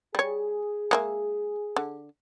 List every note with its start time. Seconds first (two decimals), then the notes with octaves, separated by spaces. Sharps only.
0.15 G3 G#4 C#5
0.91 G#3 A#3 E5
1.76 D3